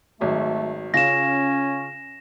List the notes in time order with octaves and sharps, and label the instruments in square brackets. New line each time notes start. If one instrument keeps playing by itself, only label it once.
[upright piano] G#1 F#3 [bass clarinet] A3
[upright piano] C#3 F4 [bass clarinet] C#4 [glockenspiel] A#6 E7